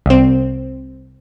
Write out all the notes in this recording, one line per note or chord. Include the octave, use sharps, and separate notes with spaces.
C2 C4